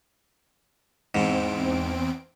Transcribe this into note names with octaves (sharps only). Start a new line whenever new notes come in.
E2 G#2 C4 D7